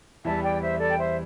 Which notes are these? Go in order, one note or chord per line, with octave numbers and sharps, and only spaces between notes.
E2 E3 G3 E5 A5
D5 G5
C5 E5
A4 D5
G5
C5 E5